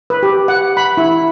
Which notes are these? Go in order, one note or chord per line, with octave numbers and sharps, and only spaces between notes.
B4
G4
F#5
B5
E4